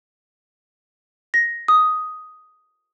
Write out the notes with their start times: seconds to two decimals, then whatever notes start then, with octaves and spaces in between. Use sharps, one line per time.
1.34 A#6
1.68 D#6